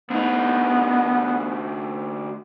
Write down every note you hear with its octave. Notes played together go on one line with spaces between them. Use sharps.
D2 B3 D#4